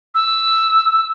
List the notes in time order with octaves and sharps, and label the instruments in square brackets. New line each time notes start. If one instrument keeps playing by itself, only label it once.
[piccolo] E6